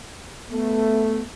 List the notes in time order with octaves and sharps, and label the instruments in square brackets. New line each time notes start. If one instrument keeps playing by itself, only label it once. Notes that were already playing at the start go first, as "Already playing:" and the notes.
[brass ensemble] A3 [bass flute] B3